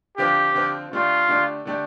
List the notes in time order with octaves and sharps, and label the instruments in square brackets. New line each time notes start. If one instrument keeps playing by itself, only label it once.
[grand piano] D3 F3 C4 F4 [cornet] G4
[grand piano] D3 F3 C4 F4
[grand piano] D3 A3 D4 G4 [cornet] F4
[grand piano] D3 A3 D4 G4
D3 A3 D4 G4